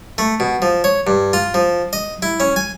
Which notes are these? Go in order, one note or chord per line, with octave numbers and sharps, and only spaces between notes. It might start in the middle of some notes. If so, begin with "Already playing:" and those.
A3
B2
F3
C#5
G2
F4
F3
D#5
E4
C#4
G#5